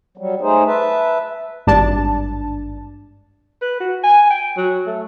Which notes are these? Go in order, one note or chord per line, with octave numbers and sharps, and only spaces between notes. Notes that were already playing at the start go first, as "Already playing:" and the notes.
F#3 G3
A3 D#4 G#4 C5
B4 E5 A5
G#1 G2 D4 A5
B4
F#4
G#5
G5
F#3
A3